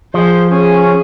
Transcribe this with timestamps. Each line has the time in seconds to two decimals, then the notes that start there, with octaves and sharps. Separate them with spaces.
0.14 F3 G#4 C5
0.50 C#4 G#4